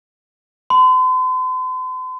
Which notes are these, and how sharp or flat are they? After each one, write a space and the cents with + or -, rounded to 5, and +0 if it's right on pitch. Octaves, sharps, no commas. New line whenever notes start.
C6 -45